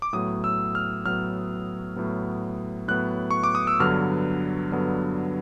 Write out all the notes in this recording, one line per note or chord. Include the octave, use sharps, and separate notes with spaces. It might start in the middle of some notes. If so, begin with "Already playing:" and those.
D6
A2 F#3 B3 D#6
E6
F6
A2 F#3 B3 F6
A2 F#3 B3
A2 F#3 B3 F#6
C#6
D6
D#6
E6
G2 D3 F#3 B3 F6
G2 D3 F#3 B3